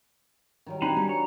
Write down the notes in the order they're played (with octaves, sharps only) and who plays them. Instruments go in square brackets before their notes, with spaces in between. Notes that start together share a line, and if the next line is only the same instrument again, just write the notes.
[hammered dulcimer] D#3 F#3 G3
[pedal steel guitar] C4 D#4 B5 [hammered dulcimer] D4 B4 G#5
[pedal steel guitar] G3 [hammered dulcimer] A#4
[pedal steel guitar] C#5